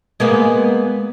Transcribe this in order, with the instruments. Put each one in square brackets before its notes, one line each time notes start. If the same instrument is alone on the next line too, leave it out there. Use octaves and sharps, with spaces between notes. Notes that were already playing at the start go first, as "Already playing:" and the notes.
[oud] G#3 A#3 B3